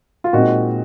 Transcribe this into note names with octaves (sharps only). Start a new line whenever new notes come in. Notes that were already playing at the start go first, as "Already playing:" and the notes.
F4
A#2 G#3 C4 D#4 F#4